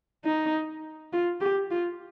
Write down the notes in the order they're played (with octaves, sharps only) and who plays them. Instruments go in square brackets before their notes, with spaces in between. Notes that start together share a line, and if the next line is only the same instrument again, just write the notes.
[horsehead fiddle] D#4
F4
G4
F4